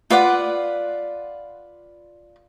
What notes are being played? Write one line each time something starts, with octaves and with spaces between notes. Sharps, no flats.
F4 B4 D5 F#5